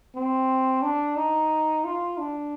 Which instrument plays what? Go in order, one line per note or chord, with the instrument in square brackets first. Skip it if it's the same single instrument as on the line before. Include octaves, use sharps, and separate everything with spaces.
[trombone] C4
D4
D#4
F4
D4